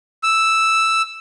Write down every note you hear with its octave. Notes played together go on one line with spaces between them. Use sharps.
E6